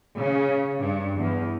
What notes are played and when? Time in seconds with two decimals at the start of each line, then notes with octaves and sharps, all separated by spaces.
0.19 C#3
0.79 G2
1.15 E2